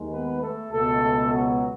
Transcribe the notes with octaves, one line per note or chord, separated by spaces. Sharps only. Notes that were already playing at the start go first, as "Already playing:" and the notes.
Already playing: D#2 D#3 G#3
B3 B4
A3 A4
C#2 B2 G#3 A3 B3 A4
F#3 F#4